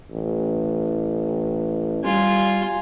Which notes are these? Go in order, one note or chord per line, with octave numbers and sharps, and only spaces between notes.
A1
G3 F4 G#5